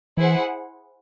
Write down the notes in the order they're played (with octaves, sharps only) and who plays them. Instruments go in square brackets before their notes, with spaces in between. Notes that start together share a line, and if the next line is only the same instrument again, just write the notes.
[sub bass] E3 [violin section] E4 G#4 C5 F#5